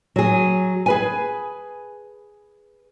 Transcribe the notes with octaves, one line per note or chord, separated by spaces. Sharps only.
F#3 G#4
G#4 B4 G#5